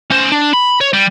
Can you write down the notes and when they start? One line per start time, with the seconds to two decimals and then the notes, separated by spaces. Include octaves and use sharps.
0.11 C#4 C5
0.32 D4
0.54 B5
0.81 C#5
0.93 G3